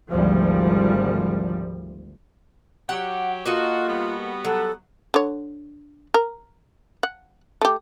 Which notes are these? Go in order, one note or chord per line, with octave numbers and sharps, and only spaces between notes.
G#1 D2 F3 G3
F#3 G4 F#5
A#3 D#4 F4 F#4 A4
G3 B3 F#4
F#3 A4
D3 C#5
A#4
F#5
A3 G4